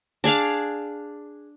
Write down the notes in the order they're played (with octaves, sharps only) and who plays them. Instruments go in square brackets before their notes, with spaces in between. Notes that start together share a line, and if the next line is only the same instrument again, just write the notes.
[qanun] D4 G#4 D5 F5